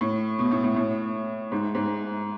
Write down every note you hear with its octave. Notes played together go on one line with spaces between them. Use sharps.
A2
B2
A2
A2
A2
G#2
G#2